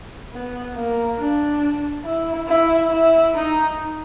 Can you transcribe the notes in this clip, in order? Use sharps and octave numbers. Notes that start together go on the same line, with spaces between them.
B3
A#3
D4
E4
E4
E4
D#4